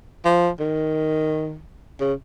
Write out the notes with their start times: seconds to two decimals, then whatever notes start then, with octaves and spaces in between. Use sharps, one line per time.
0.25 F3
0.60 D#3
2.01 C#3